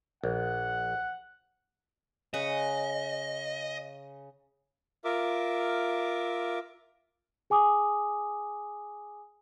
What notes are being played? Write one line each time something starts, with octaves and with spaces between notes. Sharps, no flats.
A#1 F#5
C#3 B4 D#5 C#6
F4 A#4 E5 D6
G#4 G#5 D6 D#6